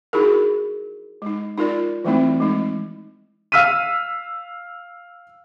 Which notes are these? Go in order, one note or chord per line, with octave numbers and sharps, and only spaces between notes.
D#4 E4 F#4 G#4 A#4
G#3 D#4
D#4 F4 A#4 D5
E3 G3 A3 C4 D#4 E4
G#3 D#4
F5 E6 F6 B6 D#7